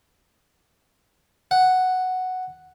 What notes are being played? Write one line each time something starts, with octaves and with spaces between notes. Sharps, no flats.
F#5